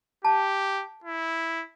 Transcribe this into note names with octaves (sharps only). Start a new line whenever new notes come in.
G4 A5
E4